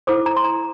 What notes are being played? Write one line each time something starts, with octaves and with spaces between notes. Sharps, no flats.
E4 A4 C5 D6
A#5
C6
A#5